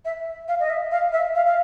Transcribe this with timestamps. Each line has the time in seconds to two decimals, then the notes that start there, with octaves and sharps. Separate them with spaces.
0.05 E5
0.48 F5
0.60 D#5
0.70 E5
0.91 F5
1.12 E5
1.35 F5
1.46 F5